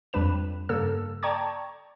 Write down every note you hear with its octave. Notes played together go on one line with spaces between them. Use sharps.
F2 G3 D4 B4 E7
G2 C#3 A#3 A4 E6
D5 G5 A5 A#5 C#6 G#6